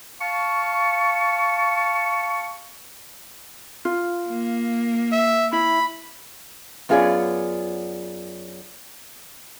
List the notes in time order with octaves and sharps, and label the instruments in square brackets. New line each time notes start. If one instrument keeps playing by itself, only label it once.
[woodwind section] F5 A5 C#6
[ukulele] F4
[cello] A#3
[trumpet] E5
[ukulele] E4 [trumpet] B5
[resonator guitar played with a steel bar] F#2 B3 F4 G#4 C#5 D5